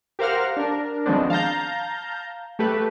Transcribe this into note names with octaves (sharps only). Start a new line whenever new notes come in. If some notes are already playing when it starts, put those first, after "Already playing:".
G4 A#4 C5 F5 F#5 F6
D4 A#4
D#3 F3 G#3 B3 C4 D4
F5 A5 A#5 G6
A3 G4 A4 B4